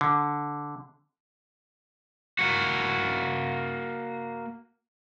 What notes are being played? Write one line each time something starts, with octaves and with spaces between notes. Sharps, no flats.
D3
A#3 F#4